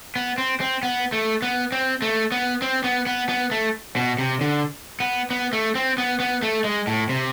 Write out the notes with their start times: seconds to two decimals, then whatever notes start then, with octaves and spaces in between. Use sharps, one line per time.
0.16 B3
0.38 C4
0.61 C4
0.83 B3
1.12 A3
1.42 B3
1.72 C4
2.02 A3
2.32 B3
2.62 C4
2.84 B3
3.06 B3
3.29 B3
3.51 A3
3.96 B2
4.19 C3
4.41 D3
5.00 B3
5.31 B3
5.53 A3
5.75 C4
5.98 B3
6.20 B3
6.43 A3
6.65 G#3
6.87 A2
7.10 C3